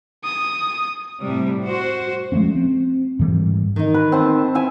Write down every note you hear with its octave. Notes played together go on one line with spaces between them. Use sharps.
D#6
A2 C3 G3
F#4 C5
F3 G#3 A3 C#4
C4
G#2 E3 G3
D#3 D#4
B4
C4 A5
E4 E5 G#5